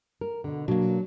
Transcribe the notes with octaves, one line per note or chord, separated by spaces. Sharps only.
A#4
B2 D3
B2 F#3 A#3 D4